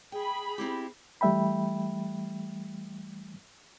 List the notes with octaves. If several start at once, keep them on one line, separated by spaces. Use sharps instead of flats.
G#4 G5 B5
C4 E4 G4
E3 G3 A3 E5 G5 B5